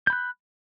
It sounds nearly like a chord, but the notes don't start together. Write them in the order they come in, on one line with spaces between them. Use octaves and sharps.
G6 B5 F#6